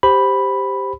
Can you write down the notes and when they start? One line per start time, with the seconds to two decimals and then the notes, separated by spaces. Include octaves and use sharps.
0.03 G4 C5 B5